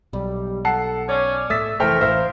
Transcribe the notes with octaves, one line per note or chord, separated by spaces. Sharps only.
B1 G3
A4 F#5 A5 C7
C#4 C#5 D5 G#5
A2 A3 E5 D#6 E6 A6 B6
F1 E3 A3 A#4 C5 G5 F6
A1 A2 C5 E5 F5